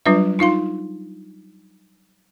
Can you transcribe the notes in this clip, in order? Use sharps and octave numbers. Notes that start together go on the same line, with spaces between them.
F#3 G3 D4 F4 B4 E5
D#4 F4 F5 C6